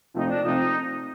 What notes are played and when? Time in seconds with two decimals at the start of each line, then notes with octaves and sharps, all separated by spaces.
0.14 C3 F3 A3 C4 D#4
0.29 D4
0.43 C3 F3 A3 C4 D#4